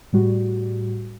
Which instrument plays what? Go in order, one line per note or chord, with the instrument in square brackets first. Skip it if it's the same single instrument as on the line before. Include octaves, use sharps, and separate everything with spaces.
[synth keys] A2 G3 F#4